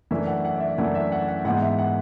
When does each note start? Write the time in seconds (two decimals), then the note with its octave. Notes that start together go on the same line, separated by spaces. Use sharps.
0.11 F#2 E3 A3 D4 E5
0.27 F#5
0.45 F#5
0.56 D5
0.60 E5
0.78 F#2 E3 A3 D4 F#5
0.95 E5
1.12 F#5
1.28 F#5
1.45 G#2 E3 B3 F#5
1.62 E5
1.79 F#5